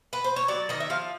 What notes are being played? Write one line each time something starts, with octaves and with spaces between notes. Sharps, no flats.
B4
C5
C#5
F#3 D5
D#3 D#5
E5
F3 F5